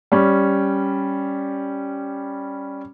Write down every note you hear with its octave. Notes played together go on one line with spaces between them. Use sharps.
G3 C#4